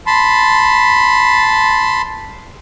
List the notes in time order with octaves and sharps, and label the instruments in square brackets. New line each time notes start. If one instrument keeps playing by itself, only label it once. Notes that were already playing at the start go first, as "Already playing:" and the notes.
[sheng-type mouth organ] A5 B5 C6